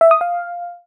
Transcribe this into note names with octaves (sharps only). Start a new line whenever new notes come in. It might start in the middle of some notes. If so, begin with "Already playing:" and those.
E5
D#6
F5